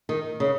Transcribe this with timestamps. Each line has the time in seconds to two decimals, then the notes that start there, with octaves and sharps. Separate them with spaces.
0.09 D#3
0.40 C#3